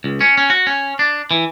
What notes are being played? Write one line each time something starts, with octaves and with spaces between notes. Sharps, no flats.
C#2
C#4
C#4
F#4
C#4
D4
E3